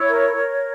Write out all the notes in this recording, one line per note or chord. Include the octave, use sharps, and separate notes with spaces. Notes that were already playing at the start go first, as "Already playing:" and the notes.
Already playing: E4 C#5
A#4
A#4